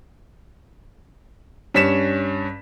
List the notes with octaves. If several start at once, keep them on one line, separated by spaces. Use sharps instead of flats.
G2 C#4 B6 E7